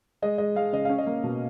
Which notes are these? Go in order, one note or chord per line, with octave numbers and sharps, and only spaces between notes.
G#3 D#5
G#3 D#5
G#3 F5
C#3 D#5
C#4 F5
D#5
A#3
B2